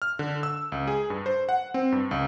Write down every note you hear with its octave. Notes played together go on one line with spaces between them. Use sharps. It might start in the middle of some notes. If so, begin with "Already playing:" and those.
F6
D3
E6
C#2
G#4
G2
C5
F#5
C4
G2
C#2